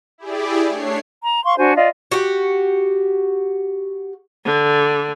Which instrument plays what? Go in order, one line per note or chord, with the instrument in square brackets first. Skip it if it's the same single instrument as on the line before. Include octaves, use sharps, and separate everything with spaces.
[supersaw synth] E4 G4 G#4 D5
A3 D4 C#5 C7
[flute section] A#5
F5 C6 C#6
D4 F#4 C5 G#5
F4 D5 D#5
[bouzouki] F#4 G4
[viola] D3